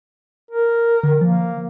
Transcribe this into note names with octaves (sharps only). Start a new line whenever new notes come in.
A#4
D3
F3 A#3